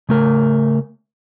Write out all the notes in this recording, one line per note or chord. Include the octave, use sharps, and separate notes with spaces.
C#3 A3 A#4